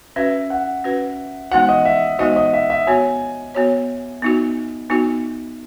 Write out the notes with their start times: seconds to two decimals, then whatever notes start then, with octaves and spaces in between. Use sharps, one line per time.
0.16 C#4 F#4 B4 E5
0.50 F#5
0.84 C#4 F#4 B4
1.51 E3 G#3 B3 D#4 F#4 F#5
1.69 D#5
1.85 E5
2.19 E3 G#3 B3 D#4 F#4 D#5
2.36 D#5
2.53 E5
2.70 E5
2.87 B3 F#4 C#5 G#5
3.55 B3 F#4 C#5
4.22 B3 D#4 F#4
4.90 B3 D#4 F#4